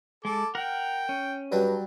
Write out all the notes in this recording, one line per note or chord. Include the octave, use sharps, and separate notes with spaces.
G#3 A4 D6
A#4 F#5 G5 A#5
C#4
G2 F#3 G3